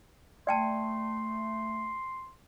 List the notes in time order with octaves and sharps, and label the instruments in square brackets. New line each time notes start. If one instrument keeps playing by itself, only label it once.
[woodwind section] A3 [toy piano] D5 G5 A5 [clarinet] C6